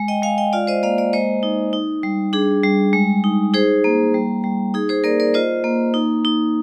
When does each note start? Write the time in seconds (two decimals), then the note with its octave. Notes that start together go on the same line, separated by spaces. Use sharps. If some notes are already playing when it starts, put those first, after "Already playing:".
Already playing: G#3
0.08 D#5 G5
0.22 G#3 F5 G#5
0.38 D#5 G5
0.53 F4 D5 F5
0.67 C5 D#5
0.83 A#3 D5 F5
0.98 D5 F5
1.13 G#3 C5 D#5
1.43 D#4
1.73 D#4
2.03 G3
2.33 D4 G#4
2.64 G3
2.93 G#3
3.24 D#4
3.54 D#4 G#4 C5
3.84 A#3
4.14 G3
4.44 G3
4.74 D#4 G#4
4.89 G#4 C5
5.04 A#3 A#4 D5
5.20 A#4 D5
5.34 F4 C5 D#5
5.64 A#3
5.94 D#4
6.25 D#4